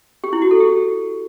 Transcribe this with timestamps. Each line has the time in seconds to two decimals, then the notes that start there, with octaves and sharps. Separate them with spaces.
0.24 G4
0.33 E4
0.42 F#4
0.51 A4
0.60 G4